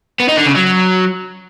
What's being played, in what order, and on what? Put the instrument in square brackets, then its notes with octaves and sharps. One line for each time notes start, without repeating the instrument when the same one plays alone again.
[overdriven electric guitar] B3
D#4
D3
C#3
F#3